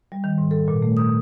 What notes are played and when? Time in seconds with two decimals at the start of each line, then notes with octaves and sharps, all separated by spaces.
0.12 G3
0.24 D#3
0.38 G#2
0.51 A4
0.68 A#2
0.82 A3
0.97 D#6